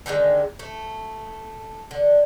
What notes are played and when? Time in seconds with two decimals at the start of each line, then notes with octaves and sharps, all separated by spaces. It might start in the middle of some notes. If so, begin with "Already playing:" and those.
0.06 D3 D#3 G3 G#3
0.59 A3
1.91 D3